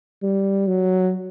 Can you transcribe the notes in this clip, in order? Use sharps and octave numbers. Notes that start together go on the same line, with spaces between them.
G3
F#3